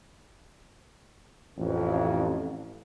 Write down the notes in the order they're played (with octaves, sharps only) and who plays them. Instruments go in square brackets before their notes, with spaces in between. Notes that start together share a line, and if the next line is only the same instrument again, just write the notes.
[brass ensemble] A1 F2